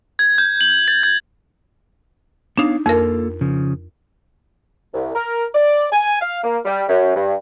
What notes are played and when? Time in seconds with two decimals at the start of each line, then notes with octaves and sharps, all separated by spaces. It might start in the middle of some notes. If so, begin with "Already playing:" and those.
0.19 G#6
0.38 G6
0.61 F#7
0.88 A6
1.03 G#6
2.58 B3 D4 D#4 C#5 F5
2.86 F2 A#3 F4 A4 A#4
3.41 C#3 F3
4.94 C2
5.15 A#4
5.55 D5
5.92 G#5
6.22 F5
6.44 A#3
6.65 G3
6.89 F#2
7.16 G2